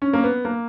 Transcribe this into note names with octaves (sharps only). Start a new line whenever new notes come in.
C#4
A#3
B3
A#3